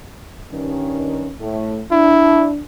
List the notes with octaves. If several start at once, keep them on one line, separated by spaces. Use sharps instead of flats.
G2 D#3 C#4
A2 A3
D4 E4